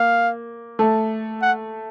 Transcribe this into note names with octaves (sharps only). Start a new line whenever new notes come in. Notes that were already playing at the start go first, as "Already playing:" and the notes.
Already playing: A#3 F5
A3 A4
F#5